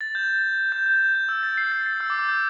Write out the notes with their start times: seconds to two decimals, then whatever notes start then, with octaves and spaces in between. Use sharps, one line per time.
0.01 A6
0.15 G6
0.72 G6
0.86 G6
1.00 G6
1.15 G6
1.29 E6
1.43 A6
1.58 C7
1.72 A6
1.86 A6
2.00 E6
2.10 D6
2.19 E6
2.28 G6